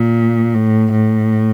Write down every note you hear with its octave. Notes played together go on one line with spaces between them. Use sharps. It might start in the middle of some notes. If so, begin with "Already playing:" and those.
Already playing: A#2
A2
A2